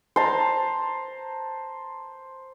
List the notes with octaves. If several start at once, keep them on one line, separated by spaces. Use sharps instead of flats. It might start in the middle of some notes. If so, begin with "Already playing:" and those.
C5 A5 A#5